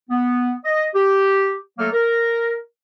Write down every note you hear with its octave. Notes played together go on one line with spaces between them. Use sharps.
B3
D#5
G4
F#3 A3 A#3 A4 F6
A#4